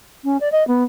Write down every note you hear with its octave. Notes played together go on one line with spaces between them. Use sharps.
C#4
D5
D#5
B3